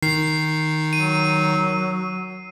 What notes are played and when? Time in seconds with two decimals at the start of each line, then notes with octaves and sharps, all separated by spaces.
0.03 D#3 C7
0.93 F#3 D#7